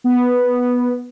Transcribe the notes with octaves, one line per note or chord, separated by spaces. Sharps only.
B3